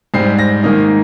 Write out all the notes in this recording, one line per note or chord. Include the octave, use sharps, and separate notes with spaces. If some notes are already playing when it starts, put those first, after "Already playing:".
G#2 G3 C4 C7
A#6
G#2 D#3 A#3 D#4